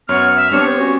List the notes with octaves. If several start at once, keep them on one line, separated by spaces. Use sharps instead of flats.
F#2 B3 C#5 F6
E5
G3 B3 C4 D4 C#5
C5
C#4 F#4